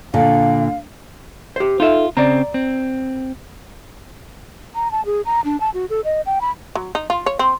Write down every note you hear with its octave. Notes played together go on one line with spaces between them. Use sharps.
A#2 D3 F5
G4 C5
D#4 F4 A4 E5
C#3 C4 D5 A#5
C4
A#5
A5
G#4
A#5
D4
A5
F#4
A4
D#5
G5
B5
F#3
D#4
F4
C#5
C4